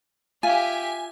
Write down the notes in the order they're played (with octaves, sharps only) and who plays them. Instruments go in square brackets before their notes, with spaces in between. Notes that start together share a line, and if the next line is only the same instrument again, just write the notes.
[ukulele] F4 [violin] G4 E5 [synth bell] G#5